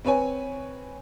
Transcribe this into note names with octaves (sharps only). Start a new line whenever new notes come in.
C4 B4 C#5 G#5